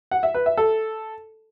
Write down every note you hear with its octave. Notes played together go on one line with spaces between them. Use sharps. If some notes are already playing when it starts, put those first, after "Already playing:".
F#5
E5
B4
E5
A4